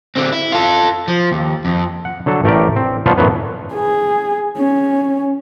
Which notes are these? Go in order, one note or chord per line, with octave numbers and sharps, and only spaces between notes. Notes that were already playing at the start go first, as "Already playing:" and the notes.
D3 C4
E4
F4 A4
F3
D#2
F2
F#5
D3 F#3 A4
A1 A3 G4 A#4 D5
C4
F3 G3 B3 F4 C#5 A5
F#2 A2 E3 F#3 B3
G#4
C#4